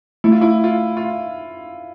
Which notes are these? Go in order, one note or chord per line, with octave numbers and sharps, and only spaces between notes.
A3 E4
F4
E4
F4
F4